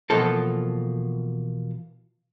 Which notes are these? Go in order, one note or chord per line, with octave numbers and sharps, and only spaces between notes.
B2 E3 F3 A#3 F4 A4